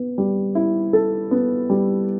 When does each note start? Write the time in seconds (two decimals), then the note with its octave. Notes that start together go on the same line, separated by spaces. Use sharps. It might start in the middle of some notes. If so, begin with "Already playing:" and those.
Already playing: B3
0.18 G3
0.55 E4
0.93 A4
1.31 B3
1.70 G3